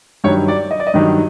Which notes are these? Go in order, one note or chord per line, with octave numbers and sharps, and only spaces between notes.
G2 D#3 F#3 C#5
D5
D#5
D5
D#5
G2 D#3 F#3